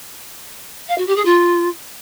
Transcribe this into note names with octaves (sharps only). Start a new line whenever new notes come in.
F5
F#4
G4
G#4
F4